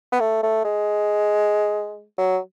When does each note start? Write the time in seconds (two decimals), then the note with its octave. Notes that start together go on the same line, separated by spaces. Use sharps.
0.12 B3
0.20 A3
0.43 A3
0.64 G#3
2.18 F#3